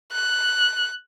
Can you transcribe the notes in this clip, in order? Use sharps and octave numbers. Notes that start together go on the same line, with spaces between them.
F#6